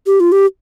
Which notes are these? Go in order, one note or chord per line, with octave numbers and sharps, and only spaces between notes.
G4
F4
G4